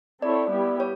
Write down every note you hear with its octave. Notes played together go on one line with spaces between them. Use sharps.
C4 E4 A4 C#5 D5
G3 B3 E4 G4
C#5